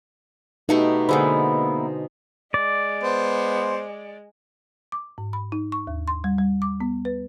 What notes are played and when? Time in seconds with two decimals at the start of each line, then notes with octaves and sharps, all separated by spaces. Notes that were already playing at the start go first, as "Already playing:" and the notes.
0.69 B2 A3 B3 D#4 G4
1.09 D3 G#3 A#3 B3 D#4 E4 C5
2.54 G#3 D5
3.03 B3 C5
4.92 D6
5.18 G#2
5.33 B5
5.52 D#4
5.72 C#6
5.87 D#2
6.08 C6
6.24 G3
6.38 G3
6.62 D6
6.80 B3
7.05 B4